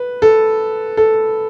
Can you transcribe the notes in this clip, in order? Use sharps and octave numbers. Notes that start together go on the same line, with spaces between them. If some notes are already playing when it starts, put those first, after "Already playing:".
Already playing: B4
A4
A4